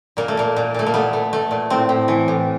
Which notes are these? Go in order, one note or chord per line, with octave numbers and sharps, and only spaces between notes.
A#2 A#3
A3
A#2 A#3
A#2
A#2 A3
A#3
A3 B3
A3
A3
A#2
A2 C4
A2
E3
A2